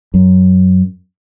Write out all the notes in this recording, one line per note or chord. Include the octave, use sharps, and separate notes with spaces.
F#2